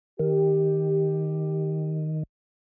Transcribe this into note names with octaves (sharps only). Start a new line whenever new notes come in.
D#3 G4